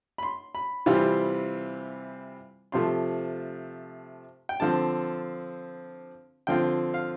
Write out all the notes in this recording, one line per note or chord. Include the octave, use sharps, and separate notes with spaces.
B5
C6
B5
C3 E3 G3 C4 F4
C3 F3 A3 C6
G5
D3 F3 C4 A5
D3 F3 C4 F4 G5
F5